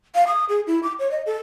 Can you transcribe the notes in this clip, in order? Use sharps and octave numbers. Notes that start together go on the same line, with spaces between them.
F5
D#6
G#4
E4
D6
C#5
D#5
A4